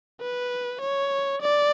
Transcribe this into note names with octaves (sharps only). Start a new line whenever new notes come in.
B4
C#5
D5